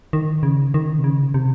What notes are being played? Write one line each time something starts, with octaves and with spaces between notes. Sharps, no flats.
D#3
C#3
D#3
C3
C#3
C3